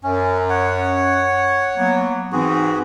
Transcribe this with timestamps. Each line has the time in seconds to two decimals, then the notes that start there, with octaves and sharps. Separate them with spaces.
0.04 F#2 C#4
0.50 C#5 F#5
1.77 F#3 A#3 B3
2.32 G#2 E3 C4 F#4 G#4